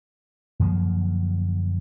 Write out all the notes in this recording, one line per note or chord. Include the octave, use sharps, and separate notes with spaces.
F#2 D3 F3 A#3